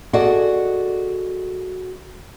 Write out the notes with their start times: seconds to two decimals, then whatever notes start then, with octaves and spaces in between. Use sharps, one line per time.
0.13 F#4 G#4 A4 D5 D#5 F#5